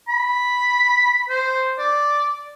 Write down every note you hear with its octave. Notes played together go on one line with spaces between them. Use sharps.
B5
C5
D5